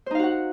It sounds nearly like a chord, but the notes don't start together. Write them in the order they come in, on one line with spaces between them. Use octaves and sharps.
C5 D#4 F5 F#4 F#5